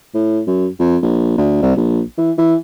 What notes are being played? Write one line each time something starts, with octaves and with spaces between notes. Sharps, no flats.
A2
F#2
F2
A#1
D2
C2
A#1
E3
E3